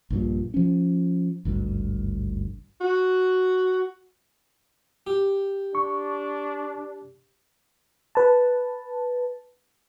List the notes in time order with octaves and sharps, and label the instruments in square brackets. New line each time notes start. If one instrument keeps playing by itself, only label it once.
[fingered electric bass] A#1 G2 A#2
F3 C#4
G#1 D2 G2
[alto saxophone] F#4
[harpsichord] G4
[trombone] D4 [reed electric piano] C#6
[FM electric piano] B4 A5